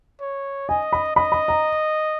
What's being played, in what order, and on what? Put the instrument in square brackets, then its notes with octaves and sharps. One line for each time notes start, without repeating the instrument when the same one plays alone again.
[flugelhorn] C#5
[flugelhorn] D#5 [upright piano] G#5
[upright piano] B5
[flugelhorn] D#5 [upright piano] B5
[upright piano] B5
A#5